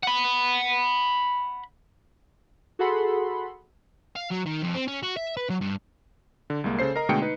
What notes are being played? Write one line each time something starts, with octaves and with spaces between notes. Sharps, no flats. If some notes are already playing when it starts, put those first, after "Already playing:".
F#5 B5
F#4 G#4 A4 F#5 B5 C6
F5
F#3
D#3
F2
C4
C#4
F#4
E5
B4
F#3
G2
D3
C2 G#3 A#3
C#3 A4 C5 C7
A#4 D#5 A#5
B2 D3 G#3 A3 G5 C#7
D#4 B4